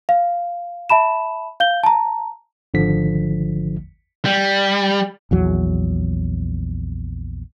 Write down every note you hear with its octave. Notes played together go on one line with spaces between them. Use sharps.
F5
E5 A5 B5 E7
F5 G6 G7
A5 A#5
G#1 D3 F3 B6
G3
A#1 E2 F#3